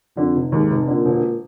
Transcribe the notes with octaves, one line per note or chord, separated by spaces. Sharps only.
F2 D3
F1
D#2 G#2
F1
A#2 D3
E1